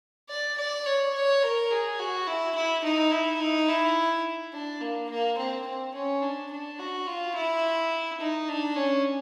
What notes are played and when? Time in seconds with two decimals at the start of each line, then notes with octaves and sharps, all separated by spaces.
0.29 D5
0.58 D5
0.86 C#5
1.14 C#5
1.42 A#4
1.71 G#4
1.99 F#4
2.27 E4
2.55 E4
2.83 D#4
3.11 E4
3.40 D#4
3.68 E4
4.53 D4
4.80 A#3
5.09 A#3
5.37 C4
5.66 C4
5.94 C#4
6.22 D4
6.51 D4
6.79 F#4
7.07 F4
7.35 E4
8.20 D#4
8.48 D4
8.76 C#4